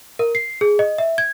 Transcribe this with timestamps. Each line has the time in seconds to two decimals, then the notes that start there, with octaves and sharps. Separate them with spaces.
0.19 A#4
0.35 C7
0.61 G#4
0.79 D#5
0.98 E5
1.18 G#6